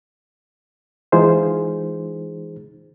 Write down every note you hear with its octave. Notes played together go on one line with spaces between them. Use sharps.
E3 G#3 D#4 F4 G#4 C5